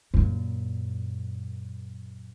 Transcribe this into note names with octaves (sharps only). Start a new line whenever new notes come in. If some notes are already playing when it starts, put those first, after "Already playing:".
F#2 A#2